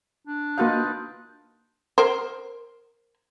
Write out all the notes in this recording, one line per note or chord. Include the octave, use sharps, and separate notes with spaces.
D4
A#3 D#4 F4 F#4 B4 F5
A#4 C5